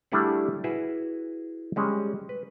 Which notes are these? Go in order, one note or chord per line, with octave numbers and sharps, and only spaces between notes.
G3 A3 D4 E4 G#4 F#5
E4 F#4 G#4 B4 E5
G3 G#3 C#4
B4